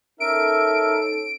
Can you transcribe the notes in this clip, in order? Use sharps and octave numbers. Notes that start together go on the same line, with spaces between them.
C#4 D#4 A4 A#4 E5 D7